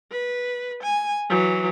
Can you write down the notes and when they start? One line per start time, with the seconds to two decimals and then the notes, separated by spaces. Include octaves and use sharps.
0.12 B4
0.83 G#5
1.30 E3 F#3